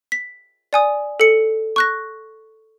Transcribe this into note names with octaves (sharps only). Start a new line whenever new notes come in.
B6
D5 G#5 D#6
A4 C#7
C#6 F#6 A#6